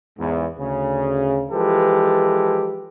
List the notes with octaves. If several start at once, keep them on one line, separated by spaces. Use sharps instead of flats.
E2 G#2
D2 C#3
E3 F3 G#3 G4 A4 B4